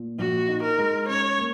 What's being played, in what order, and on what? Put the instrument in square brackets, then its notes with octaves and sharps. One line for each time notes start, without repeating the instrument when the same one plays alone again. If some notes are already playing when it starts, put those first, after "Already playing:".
Already playing: [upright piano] A#2
[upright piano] A#1 [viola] F#4
[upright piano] D#4
[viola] A#4
[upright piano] G#3
[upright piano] C#4 [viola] C#5
[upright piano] A#3